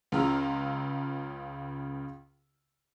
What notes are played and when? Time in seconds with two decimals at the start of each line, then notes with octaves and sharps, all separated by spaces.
0.12 C#2 C#3 F4 A#5 E6 F6